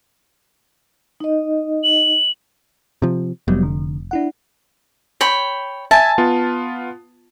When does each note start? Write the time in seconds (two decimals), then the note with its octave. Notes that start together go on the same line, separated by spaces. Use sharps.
1.20 D#4 D#5
1.84 F#7
3.02 C3 F3
3.48 F1 F#3 G3 B3
3.63 D3
4.11 D4 E4 F#5
5.21 C#5 G5 B5
5.91 E5 G#5 A5
6.18 B3 F4